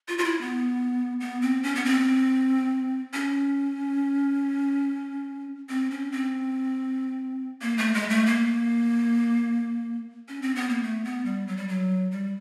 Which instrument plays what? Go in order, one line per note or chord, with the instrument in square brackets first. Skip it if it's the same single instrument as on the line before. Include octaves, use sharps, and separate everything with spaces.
[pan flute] F4
F4
E4
B3
B3
C4
C#4
B3
C4
C#4
C4
C#4
C4
A#3
A3
G#3
A3
A#3
C#4
C4
B3
A#3
A3
B3
G3
F#3
G3
F#3
G3